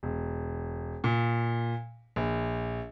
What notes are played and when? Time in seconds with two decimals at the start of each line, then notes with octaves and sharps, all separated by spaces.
0.03 E1
1.04 A#2
2.16 A#1